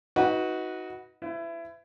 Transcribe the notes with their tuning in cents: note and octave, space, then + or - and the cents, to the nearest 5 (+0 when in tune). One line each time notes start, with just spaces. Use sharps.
D#4 +30 F#4 +0 B4 -10
E4 +25 B4 +45